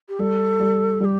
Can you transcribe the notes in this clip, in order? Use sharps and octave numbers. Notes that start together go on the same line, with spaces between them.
G4
G3 A4
G3
G3 G4 A4